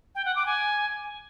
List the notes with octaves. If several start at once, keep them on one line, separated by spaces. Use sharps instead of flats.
G5
F#5
D6
G#5